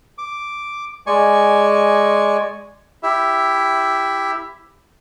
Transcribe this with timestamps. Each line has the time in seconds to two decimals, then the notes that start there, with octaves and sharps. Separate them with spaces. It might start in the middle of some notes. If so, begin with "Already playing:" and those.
0.18 D6
1.07 G#3 D5 G#5 C#6
3.03 E4 G4 E5